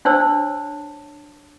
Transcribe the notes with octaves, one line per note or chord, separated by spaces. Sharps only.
D4 C5 C#5 A5 E6